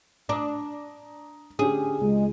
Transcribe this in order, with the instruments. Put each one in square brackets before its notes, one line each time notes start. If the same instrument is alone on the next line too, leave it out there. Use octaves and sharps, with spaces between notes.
[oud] D4 [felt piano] A#5 D#6
[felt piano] D3 C#4 G4 [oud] G#4
[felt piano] C#2 [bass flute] G#3